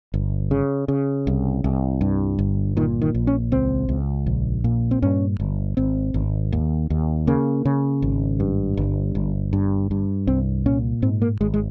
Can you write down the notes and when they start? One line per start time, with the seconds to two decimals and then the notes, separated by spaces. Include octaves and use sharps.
0.14 G1
0.51 C#3
0.88 C#3
1.27 C2
1.64 C2
2.01 G2
2.39 G1
2.77 A#2 D#3
3.02 D#3
3.15 A#1
3.27 C#4
3.52 C#2 C4
3.89 C#2
4.26 A#1
4.64 A#2
4.91 C4
5.02 G2 C#4
5.40 G1
5.77 G#1 C4
6.14 G#1
6.52 D#2
6.90 D#2
7.27 C#3 A#3
7.65 C#3
8.02 G#1
8.40 G2
8.77 G1
9.15 G1
9.53 G2
9.91 G2
10.27 C2 C4
10.66 A#2 C#4
11.02 G#2 C4
11.22 A#3
11.41 G#1 G#3
11.54 G#3